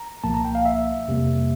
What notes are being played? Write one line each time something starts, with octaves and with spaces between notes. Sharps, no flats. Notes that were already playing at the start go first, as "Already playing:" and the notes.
Already playing: A#5
C2 A#2 F3 A#3 A5
A#5
G5
F5
E5
F2 C3 G3 A#3